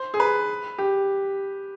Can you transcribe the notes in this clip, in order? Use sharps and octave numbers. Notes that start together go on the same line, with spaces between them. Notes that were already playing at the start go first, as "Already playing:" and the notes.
Already playing: C5
G#4
B4
G4